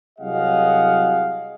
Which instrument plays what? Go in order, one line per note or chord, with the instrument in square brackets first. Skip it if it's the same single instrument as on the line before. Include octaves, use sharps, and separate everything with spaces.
[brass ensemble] C2 F#3 G#4 D#5 F5 F#5